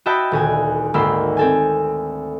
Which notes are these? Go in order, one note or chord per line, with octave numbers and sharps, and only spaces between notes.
F#4 D#5 E5 G5 A5 B5
D#1 D2 G#5
G#1 D2 A#3 B5 C6 E6
C4 A4 G#5